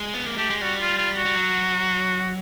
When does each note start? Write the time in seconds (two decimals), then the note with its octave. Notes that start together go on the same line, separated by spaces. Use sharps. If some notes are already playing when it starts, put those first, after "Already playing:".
Already playing: G#3
0.14 B3
0.26 A#3
0.38 A3 G4
0.50 G#3
0.61 G3 F#4
0.80 F4
0.98 F4
1.16 F#4
1.25 G3
1.35 F#3